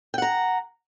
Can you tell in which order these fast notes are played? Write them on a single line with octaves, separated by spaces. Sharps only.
G5 F#5 A#5